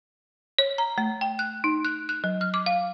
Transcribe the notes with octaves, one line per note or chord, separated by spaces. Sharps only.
C#5
A#5
A3
G5
F#6
D#4
F#6
F#6
F#3
F6
D6
F5